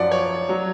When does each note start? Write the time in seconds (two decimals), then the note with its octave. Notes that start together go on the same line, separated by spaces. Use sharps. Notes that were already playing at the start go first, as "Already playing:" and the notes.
Already playing: F#2 F3 D5 F#5
0.12 C#5
0.49 F#3